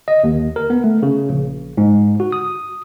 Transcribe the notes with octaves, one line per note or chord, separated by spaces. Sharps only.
D#5
D#2
A#4
B3
A3
C#3
A#1
G#2
F#4
D#6